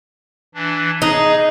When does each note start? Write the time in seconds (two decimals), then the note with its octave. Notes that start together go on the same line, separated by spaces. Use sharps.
0.54 E3 D4
1.02 D#4 G#4